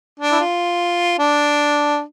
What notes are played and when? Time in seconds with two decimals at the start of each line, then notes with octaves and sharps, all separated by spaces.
0.19 D4
0.32 E4
0.40 F4
1.19 D4